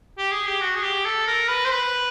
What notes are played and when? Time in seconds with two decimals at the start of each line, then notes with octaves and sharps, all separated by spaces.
0.18 G4
0.32 G#4
0.47 G4
0.61 F#4
0.76 G#4
0.83 G4
1.05 A4
1.27 A#4
1.48 B4
1.65 C5
1.71 B4